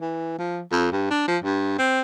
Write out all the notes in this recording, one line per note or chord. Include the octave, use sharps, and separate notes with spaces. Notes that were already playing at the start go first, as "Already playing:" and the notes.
E3
F3
F2
G2
D4
F3
G2
C4